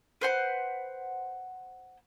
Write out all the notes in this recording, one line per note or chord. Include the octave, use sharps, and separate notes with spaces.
B4 C5 F#5